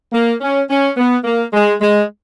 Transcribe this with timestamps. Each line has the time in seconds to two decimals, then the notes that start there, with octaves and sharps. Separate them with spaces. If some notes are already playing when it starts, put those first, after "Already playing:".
0.12 A#3
0.41 C#4
0.69 C#4
0.97 B3
1.24 A#3
1.53 G#3
1.81 G#3